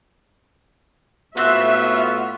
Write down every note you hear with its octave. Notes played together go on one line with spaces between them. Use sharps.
A2 A3 B3 C4 F4 F#4 E5 F#6